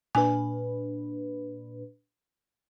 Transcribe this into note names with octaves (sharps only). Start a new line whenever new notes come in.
A#2 D4 B4 G#5